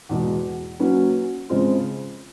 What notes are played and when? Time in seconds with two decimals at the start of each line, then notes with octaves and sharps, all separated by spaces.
0.09 E2 B2 G#3
0.80 F#3 A#3 C#4 F#4 B4
1.50 C#3 F3 G#3 C4 F4